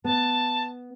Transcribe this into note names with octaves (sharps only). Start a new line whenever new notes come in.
B3 A5